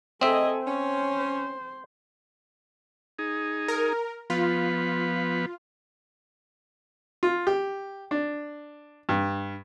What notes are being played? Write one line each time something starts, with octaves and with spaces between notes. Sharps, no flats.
A3 C4 G#4 A4 D#5 E5 G#5
C#4 C5
D#4 G#4
A#4
F3 B3 F4 B4
F4
G4
D4
G2